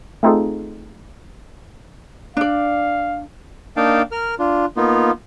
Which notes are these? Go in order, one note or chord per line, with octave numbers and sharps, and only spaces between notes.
A3 C4 D#4 F4 G#4 A4
D4 D5 F5
A#3 D4 D#4 F5 G5 A5
A#4 F6
D4 F4
A#3 B3 D#4 F4